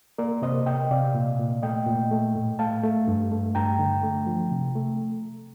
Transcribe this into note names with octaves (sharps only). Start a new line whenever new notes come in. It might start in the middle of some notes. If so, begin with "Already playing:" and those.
A#3 A#4 D5
C3 C5 D#5
C3 D#5 G5
C3 D5 F5
A#2
A#2
A3 D#5 G5
A#2
A3
A2
A3 F5 A5
A3
G2
A3
G2 G5 A#5
D3
A3
F3
C3
A3